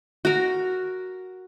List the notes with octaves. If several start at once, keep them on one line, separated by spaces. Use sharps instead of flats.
F#4 A#4